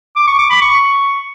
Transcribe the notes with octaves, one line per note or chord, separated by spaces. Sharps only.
D6
C#6
D6
B5
C#6